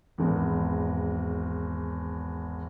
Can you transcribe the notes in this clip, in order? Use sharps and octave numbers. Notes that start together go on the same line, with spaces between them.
G#1 E2